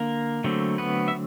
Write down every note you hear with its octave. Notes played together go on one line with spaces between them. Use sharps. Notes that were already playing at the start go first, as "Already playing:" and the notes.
Already playing: D3 A#3 A#4
D3 F#3 A3 C4
B3 B4
E5